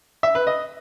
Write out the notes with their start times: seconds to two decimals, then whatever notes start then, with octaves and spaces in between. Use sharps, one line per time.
0.23 E5
0.35 B4
0.47 D#5